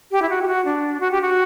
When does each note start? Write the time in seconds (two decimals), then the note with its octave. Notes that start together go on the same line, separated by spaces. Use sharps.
0.11 G4
0.22 E4
0.30 F#4
0.42 G4
0.47 F#4
0.65 D4
1.00 F#4
1.12 G4
1.21 F#4